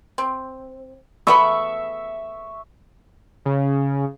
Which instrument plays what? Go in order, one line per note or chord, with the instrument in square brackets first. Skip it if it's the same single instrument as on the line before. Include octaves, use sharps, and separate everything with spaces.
[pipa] C4
[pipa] A3 B3 B5 [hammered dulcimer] E5 C#6
[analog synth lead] C#3